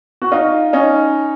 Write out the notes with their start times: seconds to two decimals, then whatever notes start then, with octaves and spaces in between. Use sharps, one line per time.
0.22 F#4
0.31 D#4 F4
0.73 C#4 D#4